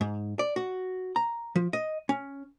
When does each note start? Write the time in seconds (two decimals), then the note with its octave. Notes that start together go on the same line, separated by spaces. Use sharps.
0.01 G#2
0.39 D5
0.56 F#4
1.16 A#5
1.56 F3
1.73 D#5
2.09 C#4